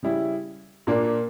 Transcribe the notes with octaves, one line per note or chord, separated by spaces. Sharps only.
C#3 G3 C#4 E4
A#2 A#3 D4